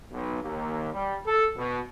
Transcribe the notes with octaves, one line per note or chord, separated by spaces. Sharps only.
B1
D#2
G3
A4
B2